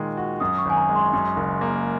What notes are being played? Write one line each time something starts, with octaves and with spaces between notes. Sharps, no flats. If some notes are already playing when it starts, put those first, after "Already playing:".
Already playing: A#2 D#3 G#3 F4
F#4
F#2 D#6
C#6
G#1 G#5
A#5
G#3
C6
F#2
F#1
A#3